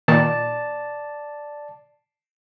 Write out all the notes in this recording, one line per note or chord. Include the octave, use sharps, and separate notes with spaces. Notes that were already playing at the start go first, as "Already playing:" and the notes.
A#2 D#3 D5 A5